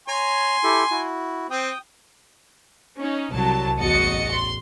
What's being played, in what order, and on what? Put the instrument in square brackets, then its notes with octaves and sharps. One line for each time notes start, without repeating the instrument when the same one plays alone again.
[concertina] C#5 A#5 [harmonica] G#5 C6
[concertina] E4 G4 A4
E4 F#4
[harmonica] C4 [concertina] G5 D#6
[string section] C#4 D#4
C2 F#3 A5
A1 E2 F#4 D#5 A6 C#7
C6